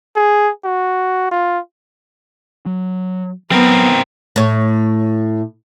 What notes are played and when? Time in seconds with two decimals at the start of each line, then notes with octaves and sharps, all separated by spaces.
0.16 G#4
0.65 F#4
1.31 F4
2.66 F#3
3.52 F#3 B3 C4 A#4
4.36 A2 C#5